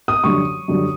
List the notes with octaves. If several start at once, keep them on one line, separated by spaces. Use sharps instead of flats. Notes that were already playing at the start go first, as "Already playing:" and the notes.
D#6
F#2 D3 G3 C#6
F#2 D3 G3